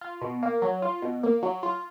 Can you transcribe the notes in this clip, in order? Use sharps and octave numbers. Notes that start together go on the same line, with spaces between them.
F4
B2
A#3
F#3
F4
B2
A#3
F#3
F4